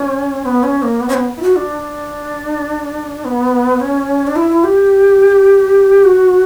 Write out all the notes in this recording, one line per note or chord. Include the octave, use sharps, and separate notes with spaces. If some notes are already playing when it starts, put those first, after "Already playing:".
Already playing: C#4
B3
C#4
A#3
B3
C#4
B3
E4
F#4
D4
B3
C#4
D4
E4
G4
F#4